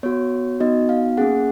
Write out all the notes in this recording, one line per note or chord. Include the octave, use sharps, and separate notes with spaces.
B3 F#4 C#5
B3 D#4 F#4 D#5
F5
A#3 C#4 G#4 F#5